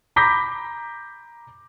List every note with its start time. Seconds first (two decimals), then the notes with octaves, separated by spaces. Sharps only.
0.16 A#5 B5 D6 G6 A#6 B6